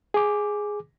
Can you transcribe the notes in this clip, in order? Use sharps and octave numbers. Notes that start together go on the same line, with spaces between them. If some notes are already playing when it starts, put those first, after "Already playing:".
G#4 D6